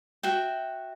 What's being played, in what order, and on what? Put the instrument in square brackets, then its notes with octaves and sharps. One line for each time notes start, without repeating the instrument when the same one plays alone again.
[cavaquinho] F#4 E5 G5